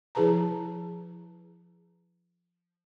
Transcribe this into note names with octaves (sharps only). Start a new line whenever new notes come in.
F3 E4 G#4 B4 A5 A#5